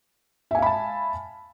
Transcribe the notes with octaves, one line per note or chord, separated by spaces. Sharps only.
E5 F5 G#5 A5 B5